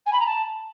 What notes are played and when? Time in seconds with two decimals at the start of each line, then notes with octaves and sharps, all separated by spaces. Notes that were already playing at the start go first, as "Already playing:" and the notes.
0.06 G#5
0.12 B5
0.19 A#5
0.26 A5